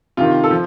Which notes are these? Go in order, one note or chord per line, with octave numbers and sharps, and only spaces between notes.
C3 D#3 F4
A4
F3